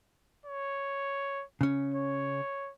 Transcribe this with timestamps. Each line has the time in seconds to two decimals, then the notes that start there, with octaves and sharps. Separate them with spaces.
0.46 C#5
1.61 C#3 C#4
1.94 C#5